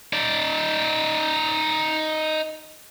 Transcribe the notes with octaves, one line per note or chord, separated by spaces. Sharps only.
D#4 D5